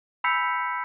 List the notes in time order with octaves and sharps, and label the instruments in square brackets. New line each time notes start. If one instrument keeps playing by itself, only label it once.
[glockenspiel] G#5 B5 E6 G6 B6 C#7